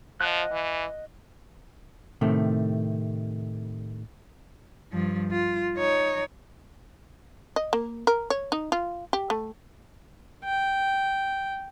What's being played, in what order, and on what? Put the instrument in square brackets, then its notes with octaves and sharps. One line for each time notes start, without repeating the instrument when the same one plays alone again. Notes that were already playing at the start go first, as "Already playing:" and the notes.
[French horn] F3 [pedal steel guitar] D#5 F#5 F#6
[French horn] E3
[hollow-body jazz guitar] A2 C3 D#3 A3
[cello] G2 F3
F4
D#4 C#5
[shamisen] D#5
A#3
A#4
C#5
D#4
F4
G4
A3
[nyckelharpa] G5